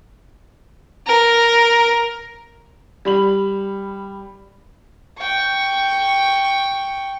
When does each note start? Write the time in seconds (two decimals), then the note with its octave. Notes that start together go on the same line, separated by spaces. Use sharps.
1.07 A#4
3.05 G3 B5 F#7
5.19 G5 C#6